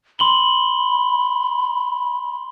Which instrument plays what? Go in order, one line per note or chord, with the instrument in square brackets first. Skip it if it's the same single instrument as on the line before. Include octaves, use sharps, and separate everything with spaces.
[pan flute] B5 [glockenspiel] C6 F#7 G7